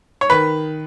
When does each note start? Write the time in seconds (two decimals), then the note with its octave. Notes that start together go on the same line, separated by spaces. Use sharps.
0.21 C#5
0.30 D#3 B4